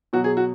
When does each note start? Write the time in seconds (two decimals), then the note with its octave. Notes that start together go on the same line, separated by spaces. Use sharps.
0.13 B2 F#3 F#4
0.24 G#4
0.37 F#4